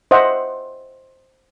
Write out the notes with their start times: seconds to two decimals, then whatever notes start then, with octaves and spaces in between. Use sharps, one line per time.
0.11 C5 D#5 E5 F#5